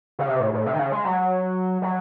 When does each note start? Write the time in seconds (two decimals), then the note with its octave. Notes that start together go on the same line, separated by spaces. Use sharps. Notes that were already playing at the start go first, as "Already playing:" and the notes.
0.19 C#3
0.28 C3
0.40 A2
0.54 A2
0.66 C3
0.74 D#3
0.79 C#3
0.92 G#3
1.05 F#3
1.82 F#3